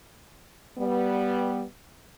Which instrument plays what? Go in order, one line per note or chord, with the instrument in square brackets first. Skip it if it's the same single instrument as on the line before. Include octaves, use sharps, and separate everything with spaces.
[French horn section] G3 B3